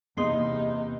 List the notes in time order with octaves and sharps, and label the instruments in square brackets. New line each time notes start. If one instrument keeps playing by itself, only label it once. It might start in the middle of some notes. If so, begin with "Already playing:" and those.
[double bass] E2 C3 [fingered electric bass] A#3 B3 [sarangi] D#4 [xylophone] G#4 C6 C7